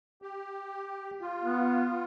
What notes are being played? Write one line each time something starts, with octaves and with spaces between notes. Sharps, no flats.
G4
F4
B3